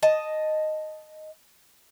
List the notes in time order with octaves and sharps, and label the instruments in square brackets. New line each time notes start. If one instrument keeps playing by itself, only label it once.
[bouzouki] D#5 A5